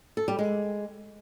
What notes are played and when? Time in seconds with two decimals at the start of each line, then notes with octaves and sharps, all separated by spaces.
0.17 A4
0.28 G3
0.39 G#3